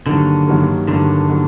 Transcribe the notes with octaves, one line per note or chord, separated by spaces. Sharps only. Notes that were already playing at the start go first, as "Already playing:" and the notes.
G2 D3 D#3 F#3 A#3
G2 D#3 F#3 A#3
G2 D3 D#3 F#3 A#3
D#3 F#3 A#3